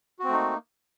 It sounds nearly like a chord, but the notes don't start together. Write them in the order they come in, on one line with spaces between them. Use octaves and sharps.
F#4 C4 A3 D#4 A#3